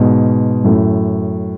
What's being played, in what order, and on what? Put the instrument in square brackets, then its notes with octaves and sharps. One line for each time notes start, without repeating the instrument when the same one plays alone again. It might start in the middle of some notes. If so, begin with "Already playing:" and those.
Already playing: [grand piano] G#2 B2
F#2 A2